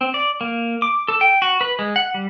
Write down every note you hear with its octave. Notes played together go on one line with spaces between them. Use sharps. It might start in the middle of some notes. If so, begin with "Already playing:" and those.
C4
D5
A#3
D6
A4
G5
F#4
B4
G#3
F#5
G3